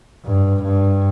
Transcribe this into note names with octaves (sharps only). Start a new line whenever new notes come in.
G2
G2